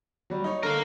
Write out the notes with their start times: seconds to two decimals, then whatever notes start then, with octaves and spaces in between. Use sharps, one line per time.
0.30 F#3 G3
0.44 D#4 C#5
0.63 D3 A#4 F5